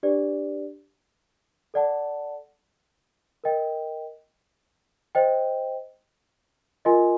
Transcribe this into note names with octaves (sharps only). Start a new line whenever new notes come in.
D4 G4 B4 D5
A4 D5 F#5 A5
A#4 D#5 G5
C5 D#5 G5
F4 A#4 D#5 G#5 C6